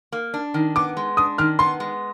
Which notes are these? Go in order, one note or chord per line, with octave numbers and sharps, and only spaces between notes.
A#3
D4
D#3
B3 D6
G#3
D4 D#6
D#3 F6
B3 C6
G#3